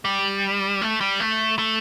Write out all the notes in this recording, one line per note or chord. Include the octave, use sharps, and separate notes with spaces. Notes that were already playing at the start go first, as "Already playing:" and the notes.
G3
A3
G3
A3
A3